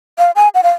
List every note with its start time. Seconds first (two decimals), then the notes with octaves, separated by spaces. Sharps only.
0.18 F5
0.36 G#5
0.55 F#5
0.63 F5